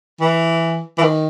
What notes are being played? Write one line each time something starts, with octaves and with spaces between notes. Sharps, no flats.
E3
E3
D#3